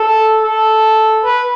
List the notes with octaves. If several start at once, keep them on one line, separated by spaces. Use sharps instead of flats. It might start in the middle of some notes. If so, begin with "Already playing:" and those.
Already playing: A4
A4
B4